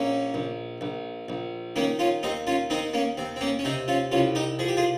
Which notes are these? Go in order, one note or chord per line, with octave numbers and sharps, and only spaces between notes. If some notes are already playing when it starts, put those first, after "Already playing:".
Already playing: A#1 A#3 C#4
A#1
A#1
A#1
D#3 A#3 C#4
C#4 F4
D#2 C4 D#4
C#4 F4
D#3 C4 D#4
A#3 C#4
D#2 C4
C4
A#3 C#4
C#4
C3 C4 D#4
C#4 F4
C2 C#4 F4
D#4 G4
F3 G#4
G4
F4 G#4